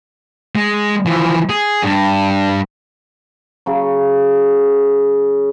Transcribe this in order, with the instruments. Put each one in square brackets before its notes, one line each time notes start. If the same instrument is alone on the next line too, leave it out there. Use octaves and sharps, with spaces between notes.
[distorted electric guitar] G#3
E3 F3
G#4
G2
[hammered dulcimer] C#3 F#3